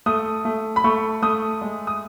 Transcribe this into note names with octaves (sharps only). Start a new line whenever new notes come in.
A3 D#6
A3
B5
A3 C#6
A3 D#6
G#3
D#6